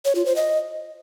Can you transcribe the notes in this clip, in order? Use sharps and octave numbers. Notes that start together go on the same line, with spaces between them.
C#5
F4
C5
D#5